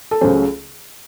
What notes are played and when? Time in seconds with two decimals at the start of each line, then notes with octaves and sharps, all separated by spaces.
0.11 A4
0.21 C#2 C#3 F#3 A3 C#4 C5